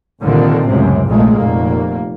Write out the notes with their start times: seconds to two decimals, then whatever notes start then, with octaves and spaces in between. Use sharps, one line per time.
0.20 C2 A#2 D3 D#3 F3 C4
0.65 C#2 F#2 A2 C3
1.07 A#1 F2 A#2 G#3 A3
1.36 F1 A#2 A#3